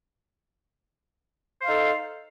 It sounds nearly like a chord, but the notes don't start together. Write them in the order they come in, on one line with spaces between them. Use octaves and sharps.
C5 F5 D#4 A4